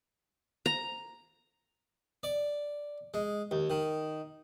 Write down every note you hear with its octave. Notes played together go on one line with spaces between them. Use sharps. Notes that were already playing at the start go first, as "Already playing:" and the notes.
A#5
D5
G#3
D#2
D#3